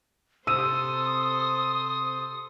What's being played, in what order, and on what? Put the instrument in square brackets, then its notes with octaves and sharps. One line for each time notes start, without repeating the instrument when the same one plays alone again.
[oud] C3 [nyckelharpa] A4 C5 [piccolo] D#6 [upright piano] E6 D#7